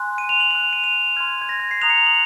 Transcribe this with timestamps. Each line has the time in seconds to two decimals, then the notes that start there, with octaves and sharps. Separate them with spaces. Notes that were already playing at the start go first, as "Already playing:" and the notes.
Already playing: G#5 C6 F#6
0.18 D#7
0.29 F7
0.40 F#7
0.51 C6 F#6 F7
0.73 D#7
0.84 F7
1.16 C6 F6 G#6
1.42 G#6
1.49 A#6
1.60 G#6
1.71 C7
1.82 A#5 D#6 F#6 F7
1.90 C#7
1.98 F7
2.06 F#7